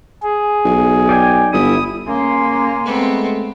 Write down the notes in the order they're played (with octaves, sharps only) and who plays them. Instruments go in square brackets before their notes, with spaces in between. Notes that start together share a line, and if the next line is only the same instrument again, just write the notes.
[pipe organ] G#4
[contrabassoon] B1
[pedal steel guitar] D5 G5 G#5
[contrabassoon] G1 [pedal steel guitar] E4 [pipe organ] D#6
[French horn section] C#3 C#4 [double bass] A#3 [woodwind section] G#5 C6
[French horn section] G#3 A3 [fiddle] B3 C4